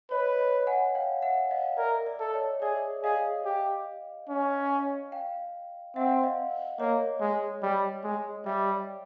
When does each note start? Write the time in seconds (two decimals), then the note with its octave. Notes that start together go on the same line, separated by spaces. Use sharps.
0.11 B4 C#5 D#5
0.39 C#5 D#5
0.67 F#5 G#5
0.95 F5 G5
1.22 E5 F#5
1.51 D#5 F5
1.78 A#4 D5 E5
2.06 D5 E5
2.20 A4
2.34 C#5 D#5
2.62 G#4 D5 E5
3.03 G#4 D#5 F5
3.45 G4
4.29 C#4
5.12 F5 G5
5.96 C4 E5 F#5
6.23 D#5 F5
6.79 A#3 C#5 D#5
7.21 G#3
7.63 G3
8.04 G#3
8.46 G3 D5 E5